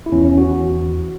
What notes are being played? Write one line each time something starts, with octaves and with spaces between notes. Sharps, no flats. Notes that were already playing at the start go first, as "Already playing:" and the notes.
E4
E2 E3 C#4
C#4
F#4